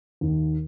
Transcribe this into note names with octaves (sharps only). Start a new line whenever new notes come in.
D#2